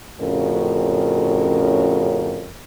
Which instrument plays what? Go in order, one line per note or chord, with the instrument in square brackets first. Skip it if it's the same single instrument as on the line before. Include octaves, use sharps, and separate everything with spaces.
[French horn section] F2 A2 C#3 C#4 F#4 A#4